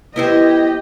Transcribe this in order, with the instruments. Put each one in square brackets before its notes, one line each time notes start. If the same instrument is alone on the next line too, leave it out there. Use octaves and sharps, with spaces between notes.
[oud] B3 E4 C5 [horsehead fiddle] G4 D#5